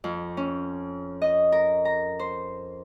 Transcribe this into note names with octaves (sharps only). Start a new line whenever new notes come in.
F2
C#4
D#5
A#4
A#5
C5